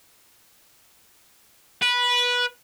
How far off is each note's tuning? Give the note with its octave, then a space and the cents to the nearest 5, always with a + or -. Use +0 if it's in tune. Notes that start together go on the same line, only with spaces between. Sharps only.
B4 -15